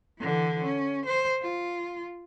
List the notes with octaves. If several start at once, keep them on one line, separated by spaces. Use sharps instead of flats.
D3 E3
C#4
C5
F4